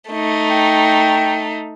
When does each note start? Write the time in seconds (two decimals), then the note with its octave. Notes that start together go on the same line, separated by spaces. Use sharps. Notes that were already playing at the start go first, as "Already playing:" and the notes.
0.10 A3 D#4
0.51 G5